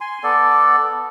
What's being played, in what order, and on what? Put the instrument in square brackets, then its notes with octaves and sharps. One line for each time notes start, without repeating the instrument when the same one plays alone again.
[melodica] G#5 C6
B3 A4 D5